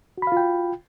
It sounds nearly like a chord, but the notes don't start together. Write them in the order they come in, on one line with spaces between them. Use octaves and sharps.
F#4 B5 F5 F4 G5